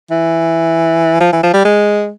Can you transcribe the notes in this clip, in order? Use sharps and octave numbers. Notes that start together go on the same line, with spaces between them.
E3
F3
E3
F3
G3
G#3